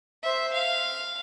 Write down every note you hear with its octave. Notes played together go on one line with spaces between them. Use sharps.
C5 E5
F5